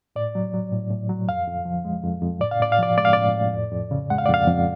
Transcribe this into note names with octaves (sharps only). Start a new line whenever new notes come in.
A2 D5
F#3
F#3
A2
A2
F#3
F2 F5
F2
F3
G#3
F2
F2
A2 D5
F5
A2 D5
F5
F3 D5
G#3 D5
F5
A2 D5
A2
F2
F2
C#3
G#3 F#5
F5
D5
F2
F5
F2